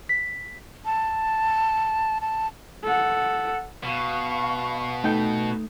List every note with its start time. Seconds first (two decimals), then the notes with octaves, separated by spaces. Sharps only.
0.09 B6
0.85 A5
2.21 A5
2.84 A4 F#5
3.84 B2 F5 C#6
5.04 A3 D#4 G5